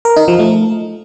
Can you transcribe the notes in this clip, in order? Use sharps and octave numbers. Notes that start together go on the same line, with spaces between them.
A#4
D#4
F3
A3